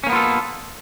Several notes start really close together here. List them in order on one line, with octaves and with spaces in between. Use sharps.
C#4 A#3 B3 F4 A4